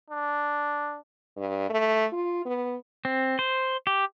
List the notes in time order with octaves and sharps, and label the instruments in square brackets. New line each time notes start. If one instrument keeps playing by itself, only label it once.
[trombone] D4
[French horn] G2
A3
F4
B3
[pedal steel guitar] C4
C5
G4